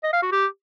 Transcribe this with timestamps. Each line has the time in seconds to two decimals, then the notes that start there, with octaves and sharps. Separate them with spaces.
0.03 D#5
0.13 F5
0.22 F#4
0.32 G4